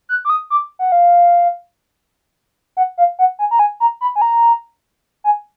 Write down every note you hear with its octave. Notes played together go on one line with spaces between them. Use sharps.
F#6
D6
D#6
D6
F#5
F5
F#5
F5
F#5
G#5
A#5
G#5
A#5
B5
G#5
A#5
G#5